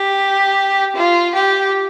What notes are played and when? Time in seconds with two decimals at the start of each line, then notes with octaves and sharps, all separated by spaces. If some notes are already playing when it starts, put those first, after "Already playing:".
Already playing: G4
0.96 F4
1.35 G4